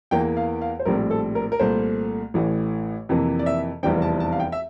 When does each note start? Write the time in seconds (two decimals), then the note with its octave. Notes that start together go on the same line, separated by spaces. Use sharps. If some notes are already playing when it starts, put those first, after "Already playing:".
0.11 E2 E3 A#3 G5
0.37 F5
0.62 F5
0.80 C5
0.85 A#1 A2 G3 C4 A#4
1.11 A4
1.35 A#4
1.52 A#4
1.60 C2 A#2 A3 C5
2.34 A1 A2 E3
3.09 F2 C3 E3 A#3
3.39 D5
3.46 E5
3.83 F1 E2 E3 G3 C4 G5
4.02 A5
4.20 A5
4.32 F5
4.40 G5
4.52 E5